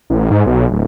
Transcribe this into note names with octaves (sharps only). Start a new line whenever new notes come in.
A1
G#2
B1
D1